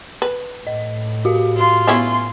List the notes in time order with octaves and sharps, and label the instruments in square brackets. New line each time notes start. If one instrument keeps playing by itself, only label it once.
[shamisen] B4
[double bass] A2 [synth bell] D#5
[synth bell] F#4 G4 F5
[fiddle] F4 C6
[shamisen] B3 C#4 E4